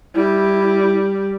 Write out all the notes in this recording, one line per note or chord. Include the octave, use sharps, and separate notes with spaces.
G3 E4